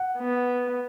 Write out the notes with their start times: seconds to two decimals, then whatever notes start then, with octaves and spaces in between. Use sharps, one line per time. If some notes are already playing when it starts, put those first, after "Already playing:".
Already playing: F#5
0.18 B3